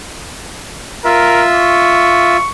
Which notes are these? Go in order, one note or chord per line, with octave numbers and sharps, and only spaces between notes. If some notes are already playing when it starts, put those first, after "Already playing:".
F4 A#4 E5
C#6